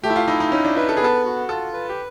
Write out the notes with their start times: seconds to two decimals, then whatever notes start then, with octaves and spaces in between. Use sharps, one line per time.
0.04 A3 G4
0.10 E4
0.16 F4
0.28 D#4 E4
0.40 D#4
0.52 C#4 D#4
0.65 D4
0.77 E4 B4
0.89 A4
0.97 G#4
1.01 B3 A4
1.25 F#4
1.49 F4 A4
1.73 B4
1.89 G4